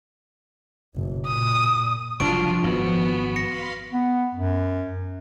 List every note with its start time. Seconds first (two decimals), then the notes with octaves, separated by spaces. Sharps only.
0.95 F#1 B1
1.26 A#2 D#6
2.20 F#1 C2 F3 F#3 D4 F4 C#6 D7
2.63 G#1 F#2 B3 F#4
3.36 F5 B5 C6 A#6 C#7
3.93 B3
4.35 F#2